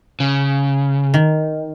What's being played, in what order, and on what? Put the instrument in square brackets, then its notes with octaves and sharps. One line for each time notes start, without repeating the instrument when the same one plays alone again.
[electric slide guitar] C#3
[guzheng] D#3